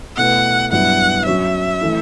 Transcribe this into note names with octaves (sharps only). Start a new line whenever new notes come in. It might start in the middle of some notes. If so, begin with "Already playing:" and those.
B2 A3 E4 B4 F#5
G2 F#3 B3 E4 F#5
F#3 C#4 F#4 C#5 E5
E3 A3 E4